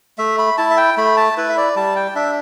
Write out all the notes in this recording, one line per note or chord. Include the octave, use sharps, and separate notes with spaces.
A3 E5
B5
E4 A5
E5
G5
A3 B5
A5
E4 B4
E5
D5
G3 A5
G5
D4 E5